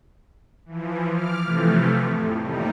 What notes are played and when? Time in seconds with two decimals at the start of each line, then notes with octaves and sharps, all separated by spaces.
0.65 E3 F3
1.12 D6 F6
1.44 C3 E3 F3 A3
2.03 F2 A2
2.39 D#2 A2 C3 G3 D#4